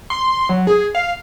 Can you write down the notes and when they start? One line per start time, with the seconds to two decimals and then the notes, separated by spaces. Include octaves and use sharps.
0.10 C6
0.49 F#3
0.67 G#4
0.95 F5